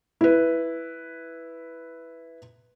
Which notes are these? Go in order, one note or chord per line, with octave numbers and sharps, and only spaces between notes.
E4 B4